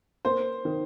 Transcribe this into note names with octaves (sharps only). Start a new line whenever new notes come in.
A#3 C5
D#3